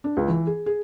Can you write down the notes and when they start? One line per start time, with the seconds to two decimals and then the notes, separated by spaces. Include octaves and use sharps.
0.04 D4
0.17 C#2
0.28 E3
0.47 G#4
0.66 G#4